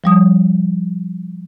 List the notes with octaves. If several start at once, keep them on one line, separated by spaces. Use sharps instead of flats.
F3 G3 D#6